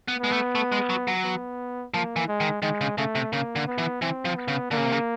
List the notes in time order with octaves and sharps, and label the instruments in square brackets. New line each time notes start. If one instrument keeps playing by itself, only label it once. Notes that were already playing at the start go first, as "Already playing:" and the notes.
[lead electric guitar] B3
[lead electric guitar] G#3 [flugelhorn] B3
[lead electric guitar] A3
A3
G#3
F#3
F#3
[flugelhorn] B3
[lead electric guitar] F3 [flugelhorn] A#3
[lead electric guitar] E3
[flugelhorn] G#3
[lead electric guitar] D#3
[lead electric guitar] D#3 [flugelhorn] G#3
[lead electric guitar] C#3
[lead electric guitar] C#3 [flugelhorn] A3
[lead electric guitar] C3
[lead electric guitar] C#3 [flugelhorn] A#3
[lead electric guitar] D3
[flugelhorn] B3
[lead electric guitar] E3
[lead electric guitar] E3 [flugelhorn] C4
[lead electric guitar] F3
[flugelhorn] B3
[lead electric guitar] C#3
[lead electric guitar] D3 [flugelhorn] A#3
[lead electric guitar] C#3
C3
C#3